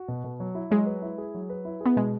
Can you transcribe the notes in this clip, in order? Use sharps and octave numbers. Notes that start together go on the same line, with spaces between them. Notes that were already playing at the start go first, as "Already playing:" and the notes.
Already playing: F#4
B2
B2
F#3
E4
F#3 G#3
B4
E4
G#4
F#3
B4
E4
B3 G#4
B2 G#3